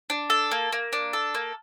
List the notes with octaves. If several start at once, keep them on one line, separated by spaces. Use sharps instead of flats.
D4
A4
A#3
A#3
D4
A4
A#3